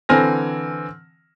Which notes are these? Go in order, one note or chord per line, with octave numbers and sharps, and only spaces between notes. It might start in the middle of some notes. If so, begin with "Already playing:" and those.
D3 E3 C4 G#5 F6 A#6